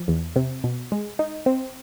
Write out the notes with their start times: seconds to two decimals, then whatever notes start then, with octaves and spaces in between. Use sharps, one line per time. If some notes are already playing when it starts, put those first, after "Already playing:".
Already playing: F3
0.08 E2
0.36 C3
0.64 B2
0.92 G#3
1.19 D#4
1.46 C4